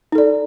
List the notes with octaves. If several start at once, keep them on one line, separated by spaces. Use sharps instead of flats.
D#4 A4 D5